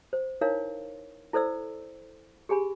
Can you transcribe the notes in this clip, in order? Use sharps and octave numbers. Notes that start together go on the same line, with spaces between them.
C5
D#4 E4 A#4 C#5 F5
E4 A4 C5 D5 E6
G4 G#4 G#5 B5